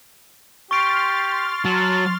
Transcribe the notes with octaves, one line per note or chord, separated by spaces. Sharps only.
G4 C6 C#6 F6 A6 D7
F#3 A5